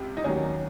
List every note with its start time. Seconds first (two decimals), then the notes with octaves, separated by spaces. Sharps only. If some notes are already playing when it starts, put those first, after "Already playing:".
Already playing: C#2 C3
0.17 D#4
0.24 D#2 D#3 F#3 C#4